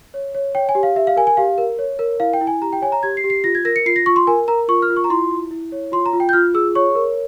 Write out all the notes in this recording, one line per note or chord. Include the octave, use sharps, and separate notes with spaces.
C#5
C#5
C#5 G5
G#5
G4
F5
G4 E5
F5
A#4 G#5
G#5
G4 F5
A#4
C#5
A#4
E4 F5
G5
E4
G#5
G4 A#5
G5
C#5 G#5
A#5
G4 G#6
C7
G4
C7
F4 A#6
G#6
A#4 A#6
C#7
F4 C7
A#6
F4 C#6
C6
A#4 G#5
A#4 A#5
F4 C#6
F6
F4
C#6
A#5
E4 C6
E4
E4
C#5
F4 C6
A#5
F4
G5
G6
F4 F6
G#4 E6
C#5 C#6
A#4